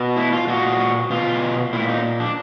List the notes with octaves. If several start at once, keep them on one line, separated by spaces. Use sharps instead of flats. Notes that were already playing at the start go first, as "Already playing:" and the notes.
Already playing: B2
E4
F4
A#2 F#4
B2 F4
A#2 E4
D#4
D4